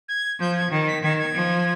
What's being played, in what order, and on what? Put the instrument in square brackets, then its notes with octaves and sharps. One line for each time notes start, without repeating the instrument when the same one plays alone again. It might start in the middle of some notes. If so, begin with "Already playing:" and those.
[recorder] G#6
[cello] F3 [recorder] G6
[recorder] G#6
[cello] D#3
[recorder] B6
[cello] D#3 [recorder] G#6
[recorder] G#6
[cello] F3